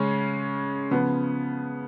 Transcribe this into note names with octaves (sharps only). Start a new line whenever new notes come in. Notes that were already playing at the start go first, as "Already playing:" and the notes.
Already playing: C#3 G#3 C#4
C#3 F3 B3